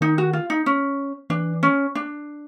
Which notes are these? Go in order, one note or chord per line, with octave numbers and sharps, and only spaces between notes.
D#3 D#4
F#4
F4
D#4
C#4
E3 D4
C#4
D4